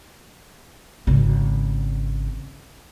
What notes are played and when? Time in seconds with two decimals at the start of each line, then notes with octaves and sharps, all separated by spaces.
1.07 G#1 C#3